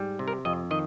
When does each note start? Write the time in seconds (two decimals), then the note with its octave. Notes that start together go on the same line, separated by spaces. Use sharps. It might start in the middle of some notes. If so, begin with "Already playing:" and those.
Already playing: G#2 G3
0.19 C3
0.28 A#4
0.45 F2 D#5
0.71 D#3 D#5